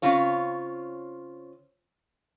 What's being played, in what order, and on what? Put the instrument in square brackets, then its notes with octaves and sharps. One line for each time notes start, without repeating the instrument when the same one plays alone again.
[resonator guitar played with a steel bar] C#3 C4 F4 C#5